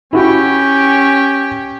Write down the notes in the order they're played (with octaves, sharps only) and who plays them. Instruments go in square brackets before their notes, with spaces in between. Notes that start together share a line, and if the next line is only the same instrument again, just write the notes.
[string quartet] C#4 G4 G5 [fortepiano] E4 F#4 B5